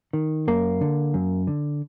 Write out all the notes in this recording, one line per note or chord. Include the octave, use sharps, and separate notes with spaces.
D#3
F#2 A#3
D3
F#2
D3